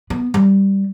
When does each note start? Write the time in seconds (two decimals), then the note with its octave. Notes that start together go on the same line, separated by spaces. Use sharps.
0.10 B3
0.34 G3